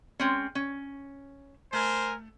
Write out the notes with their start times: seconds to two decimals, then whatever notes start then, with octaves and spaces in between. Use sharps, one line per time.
0.20 G#3 C4 C#4
0.55 C#4
1.73 A3 A#4 C5 G#5